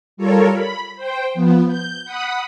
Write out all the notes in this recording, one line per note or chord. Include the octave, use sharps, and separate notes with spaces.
G3 F4 A4 A#4 C#5
B5
C5 G5
F3 B3
G6
F#5 B5 D#6